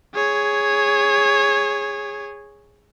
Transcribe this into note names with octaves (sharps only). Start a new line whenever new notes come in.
G#4 C#5